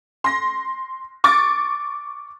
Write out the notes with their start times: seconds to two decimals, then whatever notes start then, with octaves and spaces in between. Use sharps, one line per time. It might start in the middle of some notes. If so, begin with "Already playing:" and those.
0.24 C6 A#6
1.24 C#6 D6 A6